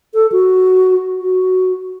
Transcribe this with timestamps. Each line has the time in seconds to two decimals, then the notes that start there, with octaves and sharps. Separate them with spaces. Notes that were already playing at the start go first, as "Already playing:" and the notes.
0.14 A4
0.32 F#4
1.22 F#4